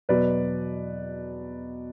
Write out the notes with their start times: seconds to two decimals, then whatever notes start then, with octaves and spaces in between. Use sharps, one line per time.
0.09 E2 B2 F#3 B4 D5